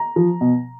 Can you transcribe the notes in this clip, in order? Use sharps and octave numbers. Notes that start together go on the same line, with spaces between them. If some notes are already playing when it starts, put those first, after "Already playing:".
Already playing: A#5
F3
B2